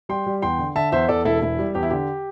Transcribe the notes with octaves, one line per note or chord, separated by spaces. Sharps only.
G3 G5 C6
G3
E2 G5 C6
D3
D3 E5 A5
E2 C5 E5
E2 A4 D5
E1 E4 A4
E1 E4
G3
E2 G4
E4
D3 G4